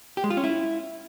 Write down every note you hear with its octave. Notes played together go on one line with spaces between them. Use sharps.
G4
G#3
F4
C#4
E4